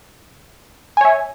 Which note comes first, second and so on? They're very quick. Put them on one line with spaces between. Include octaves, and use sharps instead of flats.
G#5 C#5 E5